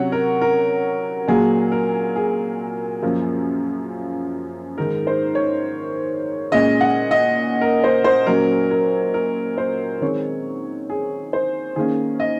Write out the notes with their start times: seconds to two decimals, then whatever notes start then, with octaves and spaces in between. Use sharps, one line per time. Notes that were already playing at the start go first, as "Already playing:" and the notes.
Already playing: C3 F#3 C#4 C#5 F#5
0.12 A#4
0.41 A#4
1.27 A#2 F#3 A#3 G#4
1.72 A#4
2.16 G#4
3.02 F#2 F3 A#3 C#4
4.77 G#2 D#3 G#3 D#4 A#4
5.07 C5
5.35 C#5
6.52 A#2 G#3 C#4 D#5
6.81 F#5
7.11 D#5
7.61 A#4
7.84 C5
8.04 C5
8.26 A#2 F#3 C#4 A#4
8.71 A#4
9.14 A#4
9.58 C5
10.01 D#3 G#3 C4 C#5
10.90 G#4
11.33 C5
11.76 D#3 A#3 C#4 G#4
12.20 D#5